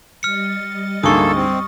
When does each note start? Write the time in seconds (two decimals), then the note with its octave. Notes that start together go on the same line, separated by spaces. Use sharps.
0.23 G3 D#5 F6 A6 C#7
1.03 D2 G#2 A#3 A4 C#6 D#6
1.36 C4